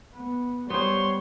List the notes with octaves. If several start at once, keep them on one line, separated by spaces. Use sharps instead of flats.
B3
G3 B3 C5 C#5 C6